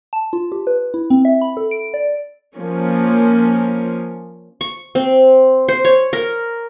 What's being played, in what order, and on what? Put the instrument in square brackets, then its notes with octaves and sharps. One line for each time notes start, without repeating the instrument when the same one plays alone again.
[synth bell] A5
F4
G4
B4
E4
C4
E5
B5
A4
D7
D5
[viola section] F3 A#3 C#4
[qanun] C#6
C4
C5
C#5
A#4